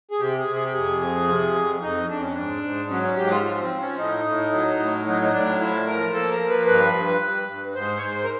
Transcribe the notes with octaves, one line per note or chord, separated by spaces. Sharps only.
G#4
C3 G4
G#4
C3
G#4
G4
F2 G#4
F3
C3
F2
F2 D#4
F2 D4
C#4
G#2 D4
G#2
F#3 C#4
C#4
G#2 G4
F4
F3 F4
C4
F3
C#4
A2 D#4
A2
F#3
A2
F#3 D#4
D#4
A2 D4
F3 E4
F3 A#4
A#3 A4
A#4
F3
B4
G2 B4
G2
G2
G2
G#2 C5
C#5
G#2 C5
A#4